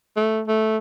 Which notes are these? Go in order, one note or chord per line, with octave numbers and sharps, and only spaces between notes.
A3
A3